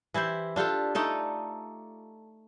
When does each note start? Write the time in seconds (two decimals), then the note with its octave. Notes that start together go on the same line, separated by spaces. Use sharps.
0.14 E3 E4 G4 C5
0.56 D4 F4 G4 A4
0.95 A3 D#4 A4 D5